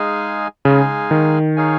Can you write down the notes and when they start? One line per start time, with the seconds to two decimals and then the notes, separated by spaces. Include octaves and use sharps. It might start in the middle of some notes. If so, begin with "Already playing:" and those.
Already playing: G#3 D#4 G#4 F5 G#5
0.65 C#3 G#3 D#4 G#4 F5 G#5
1.11 D#3
1.56 D#4 G#4 C#5 F5 G#5